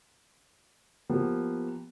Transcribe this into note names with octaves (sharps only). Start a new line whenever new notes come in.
F3 A#3 B3 G4